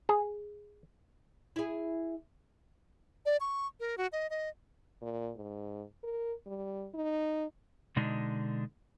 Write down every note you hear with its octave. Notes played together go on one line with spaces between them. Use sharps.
G#4
E4 G#4
D5
C#6
A#4
F#4
D#5
D#5
A#2
G#2
A#4
G3
D#4
B2 D3 G#3 D4 D#4